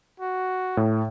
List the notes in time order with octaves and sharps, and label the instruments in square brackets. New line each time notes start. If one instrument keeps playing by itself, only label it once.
[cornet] F#4
[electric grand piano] A2